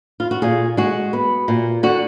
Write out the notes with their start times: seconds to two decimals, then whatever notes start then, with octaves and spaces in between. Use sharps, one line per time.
0.20 F4
0.31 F#4
0.42 A#2 F4 G#4
0.77 G#3 F#4
1.13 B3
1.48 A#2
1.83 D3 F#4